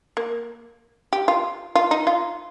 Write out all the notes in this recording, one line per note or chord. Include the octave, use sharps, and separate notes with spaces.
A#3
G4
F4
F4
D#4
F4